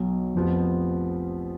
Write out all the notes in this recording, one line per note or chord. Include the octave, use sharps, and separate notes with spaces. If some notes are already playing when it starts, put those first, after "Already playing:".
Already playing: B1 B2 F#3
F1 F2 F3 B3